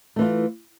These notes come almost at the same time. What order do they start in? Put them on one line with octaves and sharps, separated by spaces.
A3 E3 F4